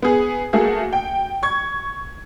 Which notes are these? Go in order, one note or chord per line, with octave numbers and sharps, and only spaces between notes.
B3 G#4
A3 A#3 F#4 G#4
G5
C#6 G#6